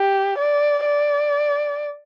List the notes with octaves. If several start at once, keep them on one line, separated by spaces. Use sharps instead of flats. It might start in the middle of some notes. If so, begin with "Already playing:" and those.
Already playing: G4
D5
D5